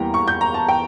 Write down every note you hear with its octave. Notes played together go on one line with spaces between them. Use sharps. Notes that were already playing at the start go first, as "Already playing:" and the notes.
Already playing: E2 E3 G3 A#3 G5 A#5
C#6
G6
A#5
A5
G5